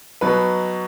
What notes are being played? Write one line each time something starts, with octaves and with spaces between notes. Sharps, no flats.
B2 F#3 B4